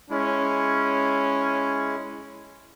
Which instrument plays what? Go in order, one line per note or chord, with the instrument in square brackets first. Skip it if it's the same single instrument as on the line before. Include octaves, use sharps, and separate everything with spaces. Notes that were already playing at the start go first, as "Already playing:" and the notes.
[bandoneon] G#3 E4 [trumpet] C#4